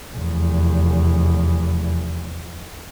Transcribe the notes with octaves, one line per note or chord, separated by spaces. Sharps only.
F1 E2